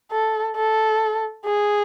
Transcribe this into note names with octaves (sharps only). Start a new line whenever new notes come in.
A4
A4
G#4